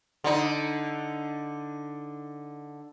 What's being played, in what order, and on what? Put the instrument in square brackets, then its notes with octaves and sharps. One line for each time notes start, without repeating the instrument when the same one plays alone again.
[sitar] D3 D#4